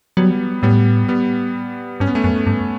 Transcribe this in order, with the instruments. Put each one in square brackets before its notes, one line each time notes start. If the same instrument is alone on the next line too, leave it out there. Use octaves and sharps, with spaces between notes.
[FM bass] F#3 [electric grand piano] G3 B3
[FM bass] A2 [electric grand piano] G3 B3
[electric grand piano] G3 B3
[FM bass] G2 [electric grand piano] C#4
[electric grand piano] B3
A3 C#4
[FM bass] F#2
G2